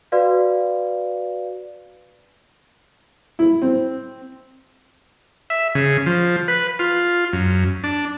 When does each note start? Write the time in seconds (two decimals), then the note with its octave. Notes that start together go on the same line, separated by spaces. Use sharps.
0.12 F#4 B4 D5 F5
3.39 E4
3.62 C4
5.50 E5
5.75 C#3
6.06 F3
6.48 B4
6.79 F4
7.33 F#2
7.84 D4